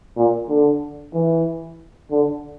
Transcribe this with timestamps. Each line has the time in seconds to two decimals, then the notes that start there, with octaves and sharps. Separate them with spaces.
0.17 A#2
0.49 D3
1.14 E3
2.11 D3